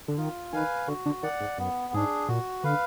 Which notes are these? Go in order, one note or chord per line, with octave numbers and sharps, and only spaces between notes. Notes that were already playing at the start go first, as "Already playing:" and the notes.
D3
D#3 F4
D#3 B4 F5 G#5
D3 F#4
D3
D#3 D5 F#5
G#2
F#2 B3
G#2 D4 G#4
A#2 F#4
D3 B4 F5